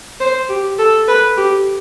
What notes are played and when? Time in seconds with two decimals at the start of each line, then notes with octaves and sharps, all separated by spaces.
0.20 C5
0.49 G4
0.79 A4
1.08 B4
1.37 G4